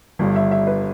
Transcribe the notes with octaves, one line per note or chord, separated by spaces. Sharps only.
G1 G2 G3
E5
E5
B4